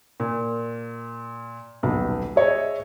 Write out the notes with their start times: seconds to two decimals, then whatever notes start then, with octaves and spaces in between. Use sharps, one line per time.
0.20 A#2
1.83 D#1 B1 B3
2.36 G#4 C#5 D#5 E5